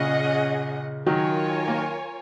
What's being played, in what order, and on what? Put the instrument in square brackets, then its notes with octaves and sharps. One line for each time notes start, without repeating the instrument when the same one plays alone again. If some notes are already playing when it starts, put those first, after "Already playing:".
Already playing: [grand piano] A#2 C#3 [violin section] C#4 G#4 D#5 F#5
[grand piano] D#3 F#3 [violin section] F4 A#4 C#5 G#5
[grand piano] A#3